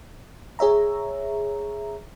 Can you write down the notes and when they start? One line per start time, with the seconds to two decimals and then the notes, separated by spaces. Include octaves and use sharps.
0.59 G#4 C#5 E5 A#5